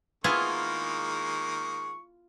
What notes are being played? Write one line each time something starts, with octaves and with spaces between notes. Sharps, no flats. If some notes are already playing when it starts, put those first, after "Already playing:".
D#3 G#3 A#3 B3 E4 F4 G#4 C#6